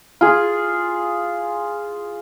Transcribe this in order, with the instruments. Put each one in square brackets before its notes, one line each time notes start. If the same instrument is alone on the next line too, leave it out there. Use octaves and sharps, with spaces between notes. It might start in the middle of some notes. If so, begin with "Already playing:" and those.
[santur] F4 G#4